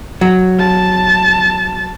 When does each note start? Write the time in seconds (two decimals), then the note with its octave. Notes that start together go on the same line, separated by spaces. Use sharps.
0.21 F#3
0.60 A5